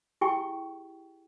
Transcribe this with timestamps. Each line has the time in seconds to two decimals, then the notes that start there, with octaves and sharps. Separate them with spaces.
0.21 E4 G4 G#4 G5 G#5 C#6